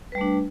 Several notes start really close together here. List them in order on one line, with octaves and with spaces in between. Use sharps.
B4 G3 A3 D4